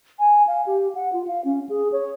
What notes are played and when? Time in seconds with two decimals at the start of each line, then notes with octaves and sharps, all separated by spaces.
0.19 G#5
0.47 F5
0.66 G4
0.95 F#5
1.13 F4
1.28 F5
1.45 C#4
1.69 G#4
1.92 C#5